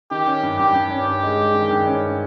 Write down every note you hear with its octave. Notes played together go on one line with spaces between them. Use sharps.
D#3 G4
C#4
G2
G2 G4
G2
C#4
C#4
G#3
G#3
D#3
G2
C#4